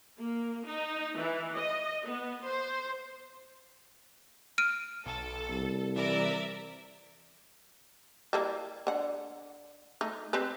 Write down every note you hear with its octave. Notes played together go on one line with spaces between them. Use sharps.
A#3
D#4
E3
D#5
B3
C5
F6 D7 D#7
B1 A4
C2
E3 A#4 D5 E5
G3 A#3 E4
D3 F#5
A3 D#4
C4 G4 B4